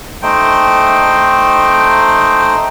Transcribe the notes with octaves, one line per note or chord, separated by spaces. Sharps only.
A3 D#4 C5 G5